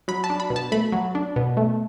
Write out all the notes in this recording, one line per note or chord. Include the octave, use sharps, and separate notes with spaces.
F#3 B5
A5
D4
B5
B2
A5
A3 B5
F#3
D4
B2
A3